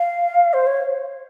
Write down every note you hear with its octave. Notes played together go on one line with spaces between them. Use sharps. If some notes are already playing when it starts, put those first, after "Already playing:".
Already playing: F5
C5
C#5